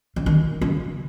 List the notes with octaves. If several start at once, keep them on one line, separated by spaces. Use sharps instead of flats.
C#3
D#3
C#3